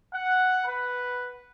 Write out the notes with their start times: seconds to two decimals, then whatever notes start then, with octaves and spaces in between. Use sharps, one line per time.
0.13 F#5
0.66 B4